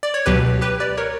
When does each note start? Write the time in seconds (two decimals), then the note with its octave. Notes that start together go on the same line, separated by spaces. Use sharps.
0.03 D5
0.14 C#5
0.26 C#2 B2 F#3 G4 B4
0.61 G4 B4
0.80 B4 D5
0.97 A#4 C#5